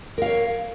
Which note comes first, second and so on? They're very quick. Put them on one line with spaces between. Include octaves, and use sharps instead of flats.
A#4 F5 C#5